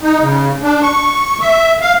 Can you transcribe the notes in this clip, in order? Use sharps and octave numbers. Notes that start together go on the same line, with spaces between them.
D#4
C#3
D4
C#6
E5
F5